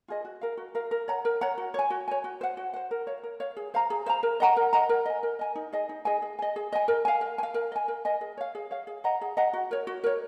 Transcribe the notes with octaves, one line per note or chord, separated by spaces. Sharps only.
F4 G#4 D#5
F#4
A#4 F5
F#4
A#4 F5
A#4
C#5 F#5 A#5
A#4
C#5 F#5 A#5
F#4
C#5 G#5
F#4
C#5 G#5
F#4
C5 F#5
F#4
C5 F#5
A#4
C#5 F5
A#4
C#5 F5
G#4
C5 F5 A#5
G#4
C5 F5 A#5
A#4
D#5 F#5 A#5
A#4
D#5 F#5 A#5
A#4
D#5 G#5
A#4
D#5 G#5
D#4
G#4 D#5 G#5
D#4
G#4 D#5 G#5
G#4
D#5 G#5
G#4
D#5 G#5
A#4
F5 G#5
A#4
G#5
F5
A#4
D#5 G#5
A#4
D#5 G#5
G#4
C#5 F5
G#4
C#5 F5
G#4
D#5 F#5 A#5
G#4
D#5 F#5 A#5
F#4
A#4 C#5
F#4
A#4 C#5